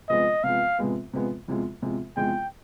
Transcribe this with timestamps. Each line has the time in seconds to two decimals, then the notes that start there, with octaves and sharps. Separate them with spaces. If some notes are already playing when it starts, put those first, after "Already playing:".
0.09 C3 F3 G#3 B3 D#5
0.44 C3 F3 G#3 B3 F5
0.78 C3 F3 G#3 B3
1.13 C3 F3 G#3 B3
1.48 E2 C3 F3 G#3
1.82 E2 C3 F3 G#3
2.16 E2 C3 F3 G#3 G5